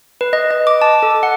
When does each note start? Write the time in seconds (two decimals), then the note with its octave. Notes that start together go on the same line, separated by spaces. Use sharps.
0.21 B4
0.33 D#5
0.51 D#5
0.67 D6
0.82 A5
1.03 A4
1.23 F#5